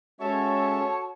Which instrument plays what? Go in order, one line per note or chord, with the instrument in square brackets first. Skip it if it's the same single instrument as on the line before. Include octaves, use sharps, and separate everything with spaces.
[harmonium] G#3 C#4 E5 [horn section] F#4 A4 C#5 [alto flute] A5